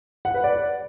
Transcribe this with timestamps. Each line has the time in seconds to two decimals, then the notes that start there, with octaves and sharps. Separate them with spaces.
0.25 F#5
0.34 B4
0.44 D5